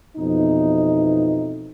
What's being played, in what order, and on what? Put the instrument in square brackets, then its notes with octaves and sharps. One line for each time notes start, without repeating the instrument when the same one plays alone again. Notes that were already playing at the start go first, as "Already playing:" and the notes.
[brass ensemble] F2 B2 E3 D#4